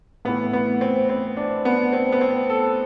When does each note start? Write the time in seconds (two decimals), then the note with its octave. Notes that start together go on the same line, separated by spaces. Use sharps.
0.25 A2 E3 B3
0.53 B3
0.81 C4
1.09 C4
1.37 D4
1.65 B3
1.93 C4
2.12 B3
2.21 C4
2.50 A4